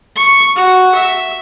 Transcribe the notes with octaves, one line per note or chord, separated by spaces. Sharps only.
C#6
F#4
E5